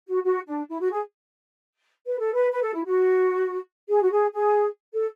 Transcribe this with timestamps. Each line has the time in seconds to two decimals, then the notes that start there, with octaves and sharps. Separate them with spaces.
0.08 F#4
0.23 F#4
0.46 D4
0.69 E4
0.80 F#4
0.91 G#4
2.06 B4
2.19 A4
2.34 B4
2.51 B4
2.62 A4
2.74 E4
2.86 F#4
3.88 G#4
4.02 F#4
4.10 G#4
4.33 G#4
4.94 A4